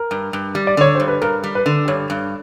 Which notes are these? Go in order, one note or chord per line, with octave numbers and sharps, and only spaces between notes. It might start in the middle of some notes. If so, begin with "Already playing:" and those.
Already playing: A#4
G2
G2
G3
D5
D3 C#5
G2 C5
B4
G2 A#4
G3
B4
D3
G2 C#5
G2